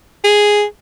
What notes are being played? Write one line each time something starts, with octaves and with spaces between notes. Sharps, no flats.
G#4